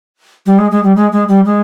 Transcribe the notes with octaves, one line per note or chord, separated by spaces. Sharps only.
G3
G#3
G#3
G3
G#3
G#3
G3
G#3